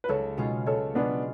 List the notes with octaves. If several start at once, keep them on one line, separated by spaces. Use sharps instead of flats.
B4
C#2 A4 C#5
B2 G#3 C#4 F4
C#2 A4 C#5
B2 G#3 B3 C#4 D4 F4